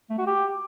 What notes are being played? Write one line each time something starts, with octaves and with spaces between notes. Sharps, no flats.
A3
F#4
G4